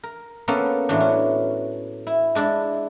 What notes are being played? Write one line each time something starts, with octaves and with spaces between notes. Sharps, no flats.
A#4
A#3 B3 C#4 A4 A#4
A2 E3 F#3 D4
C#4
E4
G#3 D4 E4 D5